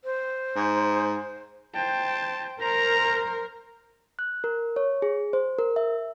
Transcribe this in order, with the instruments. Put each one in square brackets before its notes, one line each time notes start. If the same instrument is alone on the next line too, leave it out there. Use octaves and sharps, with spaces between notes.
[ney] C5
[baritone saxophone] G#2
[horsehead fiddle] C5 G5 [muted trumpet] A5
[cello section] A#4 [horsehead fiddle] C5 [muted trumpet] A#5
[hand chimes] F#6
A#4
C#5
G#4
C5
A#4
E5